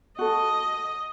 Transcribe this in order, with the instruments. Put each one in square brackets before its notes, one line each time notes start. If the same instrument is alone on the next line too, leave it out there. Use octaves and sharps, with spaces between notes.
[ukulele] F#4 A4 [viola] D#5